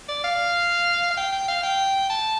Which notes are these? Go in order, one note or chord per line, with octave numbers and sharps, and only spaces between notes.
D5
F5
F5
G5
G5
F5
G5
A5